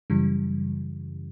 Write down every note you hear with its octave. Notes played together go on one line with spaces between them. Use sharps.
F#2 C#3 E3 G3